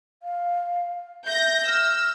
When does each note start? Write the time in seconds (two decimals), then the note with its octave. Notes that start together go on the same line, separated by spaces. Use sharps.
0.23 F5
1.26 E5 G6 A#6
1.68 E6 F6